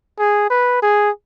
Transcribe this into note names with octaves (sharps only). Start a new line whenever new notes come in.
G#4
B4
G#4